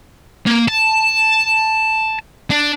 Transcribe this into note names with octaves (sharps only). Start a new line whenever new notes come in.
A#3
A5
D4